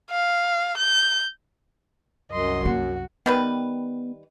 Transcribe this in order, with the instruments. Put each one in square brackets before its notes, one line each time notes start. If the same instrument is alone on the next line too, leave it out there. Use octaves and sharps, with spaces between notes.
[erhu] F5
G6
[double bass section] C2 F#3 [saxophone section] F#2 [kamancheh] D#5 C6
[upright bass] A#3 [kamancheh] F#4
[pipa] D#3 G3 B4 [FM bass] B3